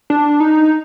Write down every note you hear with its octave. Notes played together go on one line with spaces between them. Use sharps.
D4
D#4